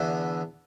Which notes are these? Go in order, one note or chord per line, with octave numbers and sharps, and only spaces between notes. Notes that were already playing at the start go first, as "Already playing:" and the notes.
Already playing: E2 D3 B3 E4